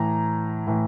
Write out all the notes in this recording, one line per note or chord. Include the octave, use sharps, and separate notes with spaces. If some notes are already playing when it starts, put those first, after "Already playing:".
Already playing: A2 E3 A#5
A2 E3